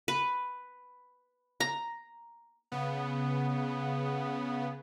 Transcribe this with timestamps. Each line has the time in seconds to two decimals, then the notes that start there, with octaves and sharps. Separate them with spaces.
0.08 B4
1.60 A#5
2.72 C#3 B3